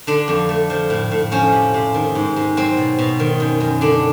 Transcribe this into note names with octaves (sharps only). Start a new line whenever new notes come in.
D3 D4
F2
A3
F3
A2
A2
F3 C#4
C3
C3
D#3
G#2
G#2
F#3 C4
B2
B2
D#3
F#2
F#2
D3 D4